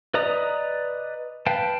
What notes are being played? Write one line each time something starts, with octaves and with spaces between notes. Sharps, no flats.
B4 D5 D#5 A#5 D#6
B4 F5 G5 A5